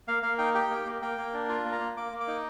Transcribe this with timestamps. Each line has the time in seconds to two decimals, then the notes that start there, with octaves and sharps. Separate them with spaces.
0.08 A#3 F5
0.23 A#3 F5
0.38 D#4 G5
0.54 G4 G5
0.70 A#3
0.86 A#3
1.02 A#3 G5
1.18 A#3
1.34 D4
1.49 F4
1.65 A#3
1.72 A#5
1.81 A#3
1.97 A#3 D6
2.13 A#3
2.20 D6
2.28 D#4